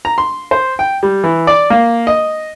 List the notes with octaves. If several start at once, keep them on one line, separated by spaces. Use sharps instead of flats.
A#5
C6
C5
G5
G3
E3
D5
A#3
D#5